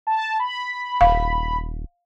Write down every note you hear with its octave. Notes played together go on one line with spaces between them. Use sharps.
A5
B5
D#1 F5